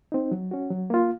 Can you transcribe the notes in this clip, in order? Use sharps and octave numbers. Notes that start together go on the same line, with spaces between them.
C4 D#4
F#3
C#4 F#4
F#3
A#3 F4